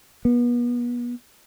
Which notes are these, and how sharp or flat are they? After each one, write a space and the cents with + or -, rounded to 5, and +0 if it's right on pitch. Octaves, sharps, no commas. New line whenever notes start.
B3 -35